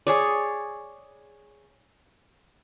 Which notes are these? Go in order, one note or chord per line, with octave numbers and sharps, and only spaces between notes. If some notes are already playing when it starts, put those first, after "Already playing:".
G#4 C#5 D5